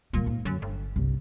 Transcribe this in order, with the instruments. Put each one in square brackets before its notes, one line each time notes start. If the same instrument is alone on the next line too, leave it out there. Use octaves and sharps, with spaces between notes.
[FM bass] A#2 [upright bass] D#3 G3
[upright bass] G#2 A#3
[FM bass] F#2 [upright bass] D3
[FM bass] G1
[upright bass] C2 G2